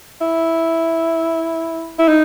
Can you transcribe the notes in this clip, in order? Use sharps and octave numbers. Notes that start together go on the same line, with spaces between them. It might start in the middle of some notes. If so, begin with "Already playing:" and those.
E4
E4
D#4